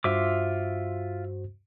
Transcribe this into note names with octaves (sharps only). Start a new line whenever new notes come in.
G2 F4 F#4 C5 E5 D6